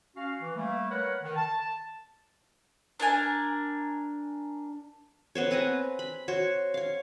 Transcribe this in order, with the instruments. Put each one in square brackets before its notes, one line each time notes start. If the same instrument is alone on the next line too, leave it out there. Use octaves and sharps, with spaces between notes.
[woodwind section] C#4 F#4 F5
E3
G3 A3 A#3
A#4 B4 C#5 F#5
D#3
A5
[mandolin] D4 A#4 G#5
[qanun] B3 C5 C#5
C4 B4 G#5 A#5
B5
F#4 C5 C#5
C#5 F5